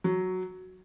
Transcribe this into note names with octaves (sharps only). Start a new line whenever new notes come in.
F#3